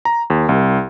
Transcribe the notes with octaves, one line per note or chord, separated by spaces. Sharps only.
A#5
D#2
C2